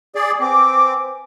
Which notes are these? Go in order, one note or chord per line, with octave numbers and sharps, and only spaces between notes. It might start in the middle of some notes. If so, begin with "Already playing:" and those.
G#4 D5
C4 B4 G#5 D6